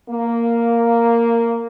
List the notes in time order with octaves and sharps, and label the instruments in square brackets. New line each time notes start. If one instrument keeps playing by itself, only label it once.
[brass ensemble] A#3